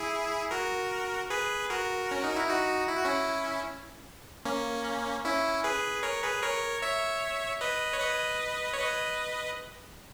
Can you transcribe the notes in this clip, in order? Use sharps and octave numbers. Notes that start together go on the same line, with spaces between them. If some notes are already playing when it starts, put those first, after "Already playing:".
Already playing: E4 G#4
F#4 A#4
G#4 B4
F#4 A#4
C#4
D#4
E4
D#4 F#4
E4
F#4
C#4 E4
A#3 C#4
C#4 E4
G#4 B4
A#4 C#5
G#4 B4
A#4 C#5
C#5 E5
B4 D#5
C#5
B4 D#5
C#5
B4 D#5